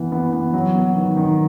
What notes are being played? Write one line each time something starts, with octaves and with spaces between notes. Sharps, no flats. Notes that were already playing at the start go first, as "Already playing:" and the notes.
Already playing: E3 B3
B3
B3
F#3
B3
D#3
D#3